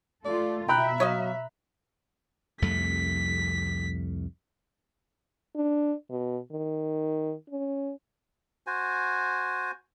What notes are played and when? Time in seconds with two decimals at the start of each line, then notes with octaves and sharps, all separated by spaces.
0.25 A3 F4 A4 D5
0.69 B2 E5 G5 A#5 B5 F#6
1.00 F#3 C#5 D#5 F5
2.62 C2 F2 A3 B6
5.56 D4
6.10 B2
6.51 D#3
7.50 C#4
8.67 F#4 C5 G#5